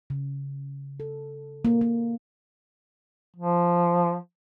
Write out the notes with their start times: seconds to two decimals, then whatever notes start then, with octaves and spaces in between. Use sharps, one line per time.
0.10 C#3
1.00 A4
1.65 A#3
1.81 A#3
3.36 F3